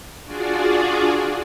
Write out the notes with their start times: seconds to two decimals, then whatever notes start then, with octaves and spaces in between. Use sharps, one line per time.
0.24 D4 F4 F#4 G#4 D5